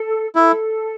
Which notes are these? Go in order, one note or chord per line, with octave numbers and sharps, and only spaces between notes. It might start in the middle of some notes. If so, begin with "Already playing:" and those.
Already playing: A4
E4 A4